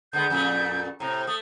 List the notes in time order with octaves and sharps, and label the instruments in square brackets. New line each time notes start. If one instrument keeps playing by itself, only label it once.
[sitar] D3 G#3 B3 [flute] G6
[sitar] F2 A#2 A3
[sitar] A2 C3 [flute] A#5
[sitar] A3 [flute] D#6